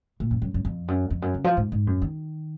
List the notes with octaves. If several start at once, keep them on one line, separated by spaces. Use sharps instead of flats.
A#2
F#2
F#2
F#2
F2
F#2
F2
F#2
C#3
F3
G#2
G#2
F#2
D#3